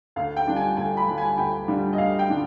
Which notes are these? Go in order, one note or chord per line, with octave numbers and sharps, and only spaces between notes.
D2 F5
G5
D3 G3 D4 F4
G#5
D2 G#5
B5
D3 G3 D4 F4
G#5
D2 G5
D3 G3 D4 F4
D#5
D2 F5
G5
D3 G3 D4 F4